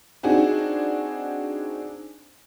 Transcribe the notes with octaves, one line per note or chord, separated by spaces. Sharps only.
C4 D4 D#4 F#4 G#4